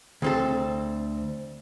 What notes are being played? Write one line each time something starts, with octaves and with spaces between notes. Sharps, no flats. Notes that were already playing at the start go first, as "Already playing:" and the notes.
D2 C4 A4